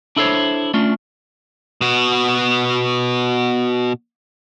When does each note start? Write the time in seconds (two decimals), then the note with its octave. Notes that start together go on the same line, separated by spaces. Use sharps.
0.16 D4 E4 A4 A#4 C5 C#5
0.74 A3 C#4 D4 F4
1.81 B2 F#4